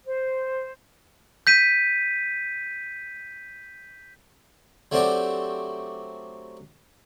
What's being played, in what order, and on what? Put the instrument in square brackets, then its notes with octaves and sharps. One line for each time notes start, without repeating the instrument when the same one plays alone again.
[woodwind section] C5
[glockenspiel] G6 B6 D#7
[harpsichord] F#3 A3 C4 D4 F#4 G4